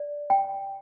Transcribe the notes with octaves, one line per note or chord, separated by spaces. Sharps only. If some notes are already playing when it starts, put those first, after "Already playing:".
Already playing: D5
G5